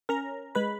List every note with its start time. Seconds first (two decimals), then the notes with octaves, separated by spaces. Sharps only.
0.09 C#4 A#4 A#5
0.55 G#3 B4 B5